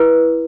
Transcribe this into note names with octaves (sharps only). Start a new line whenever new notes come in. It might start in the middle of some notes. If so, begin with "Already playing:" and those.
Already playing: E4 B4